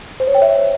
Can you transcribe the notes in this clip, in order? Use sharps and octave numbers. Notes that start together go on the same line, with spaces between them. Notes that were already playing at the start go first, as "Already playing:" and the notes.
C5
C#5
G5
E5